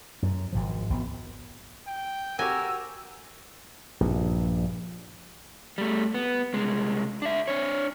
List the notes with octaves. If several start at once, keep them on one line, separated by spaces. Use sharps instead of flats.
F#2
G#1 C#2 F3
G#1 C#3 B3
G5
F#4 G4 A#4 G#5 E6
A#1 G2
G3 A3
B3
C2 G#3
D4 E5
D4 C#5